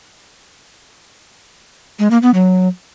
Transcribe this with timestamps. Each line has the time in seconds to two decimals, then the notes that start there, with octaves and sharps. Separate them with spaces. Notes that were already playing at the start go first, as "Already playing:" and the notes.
1.99 G#3
2.11 A#3
2.22 B3
2.34 F#3